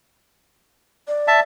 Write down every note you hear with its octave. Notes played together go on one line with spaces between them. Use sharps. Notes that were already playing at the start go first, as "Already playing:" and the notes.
D5
E5 A5